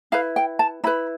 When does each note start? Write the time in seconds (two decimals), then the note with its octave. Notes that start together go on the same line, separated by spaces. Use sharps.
0.12 E4 B4 F5
0.36 G5
0.59 A5
0.84 E4 B4 B5